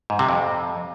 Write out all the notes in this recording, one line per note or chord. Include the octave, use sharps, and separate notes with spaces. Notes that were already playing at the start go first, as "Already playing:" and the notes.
G#2
C3
F2